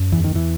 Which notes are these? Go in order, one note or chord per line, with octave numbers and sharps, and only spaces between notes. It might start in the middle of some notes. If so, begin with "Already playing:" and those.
Already playing: F#2
E2 E3
D#3
E2 E3